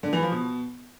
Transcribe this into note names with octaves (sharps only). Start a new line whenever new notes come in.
D3
E3
F3
B2